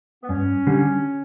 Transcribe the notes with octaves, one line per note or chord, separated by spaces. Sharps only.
B3
G2 C#4
D3 G3